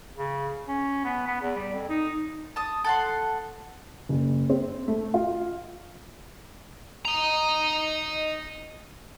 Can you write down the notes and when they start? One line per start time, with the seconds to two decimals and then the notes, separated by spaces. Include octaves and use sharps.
0.17 C#3
0.68 C#4
1.05 B3
1.27 B3
1.41 E2
1.55 G3
1.73 F2
1.89 D#4
2.56 A5 D#6
2.84 A4 F#5 C6
4.09 F#1
4.50 C4
4.88 A3
5.14 F4
7.05 D#5 A#5